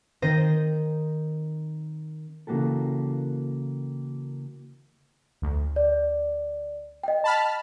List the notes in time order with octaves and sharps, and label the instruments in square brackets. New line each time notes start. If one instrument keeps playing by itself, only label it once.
[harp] D#3 C4 C5 D#5 A#6
[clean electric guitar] C#3 E3 A#3 F#4 G4 A4
[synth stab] D2
[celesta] D5
D#5 G5
[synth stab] A5 B5 F6